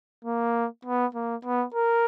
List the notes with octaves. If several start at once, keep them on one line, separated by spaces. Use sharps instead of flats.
A#3
B3
A#3
B3
A#4